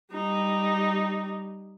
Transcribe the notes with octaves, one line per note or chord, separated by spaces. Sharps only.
G3 D#4